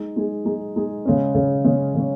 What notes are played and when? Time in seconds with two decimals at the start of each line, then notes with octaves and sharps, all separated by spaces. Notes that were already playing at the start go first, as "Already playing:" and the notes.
Already playing: G#3 D#4 G#4
0.16 G#3 D#4 G#4
0.46 G#3 D#4 G#4
0.76 G#3 D#4 G#4
1.05 C#3 G#3 C#4
1.35 C#3 G#3 C#4
1.64 C#3 G#3 C#4
1.95 C#3 G#3 C#4